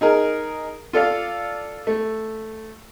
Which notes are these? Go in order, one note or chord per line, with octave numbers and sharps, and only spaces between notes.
D#4 G#4 A#4
F4 A4 D5 F5
A3